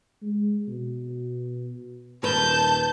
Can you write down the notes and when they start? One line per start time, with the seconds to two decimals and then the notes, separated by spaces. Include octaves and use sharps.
0.22 G#3
0.68 B2
2.23 D#1 A#4 B4 A5 G6